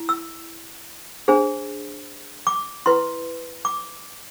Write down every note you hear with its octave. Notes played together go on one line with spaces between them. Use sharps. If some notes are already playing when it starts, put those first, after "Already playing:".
Already playing: E4
E6
D4 G#4 C5
D6
E4 B4 C6
D6